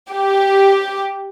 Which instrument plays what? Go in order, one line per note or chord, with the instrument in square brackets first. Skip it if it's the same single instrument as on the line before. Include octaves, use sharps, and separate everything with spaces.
[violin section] G4